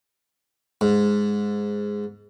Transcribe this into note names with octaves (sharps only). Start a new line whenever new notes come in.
G#2